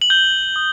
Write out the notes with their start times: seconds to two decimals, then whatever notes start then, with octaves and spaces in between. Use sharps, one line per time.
0.02 F#7
0.10 G6 G7
0.56 D#6